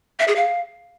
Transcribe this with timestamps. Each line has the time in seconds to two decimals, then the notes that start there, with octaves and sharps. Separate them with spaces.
0.20 E5
0.28 G#4
0.36 F5